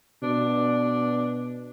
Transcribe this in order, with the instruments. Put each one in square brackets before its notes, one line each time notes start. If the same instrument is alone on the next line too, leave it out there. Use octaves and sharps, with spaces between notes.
[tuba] B2 [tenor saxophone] D4